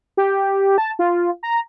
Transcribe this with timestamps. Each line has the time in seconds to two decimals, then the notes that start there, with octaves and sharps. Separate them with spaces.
0.17 G4
0.78 A5
0.99 F4
1.43 A#5